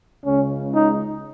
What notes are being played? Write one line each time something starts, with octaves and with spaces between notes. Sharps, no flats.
C#2 C#3 G#3 C#4
D#4